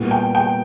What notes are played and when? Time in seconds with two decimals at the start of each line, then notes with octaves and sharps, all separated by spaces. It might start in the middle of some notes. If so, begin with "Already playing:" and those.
Already playing: A#2 G3 B3 E4 A#4
0.11 G5
0.35 G5